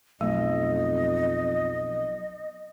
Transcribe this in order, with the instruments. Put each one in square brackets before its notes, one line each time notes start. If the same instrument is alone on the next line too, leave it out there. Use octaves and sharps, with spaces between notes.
[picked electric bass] B1 [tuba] F2 [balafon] A3 [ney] D#5